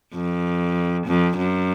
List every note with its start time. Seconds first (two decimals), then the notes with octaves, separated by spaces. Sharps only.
0.14 F2
1.07 F2
1.37 F#2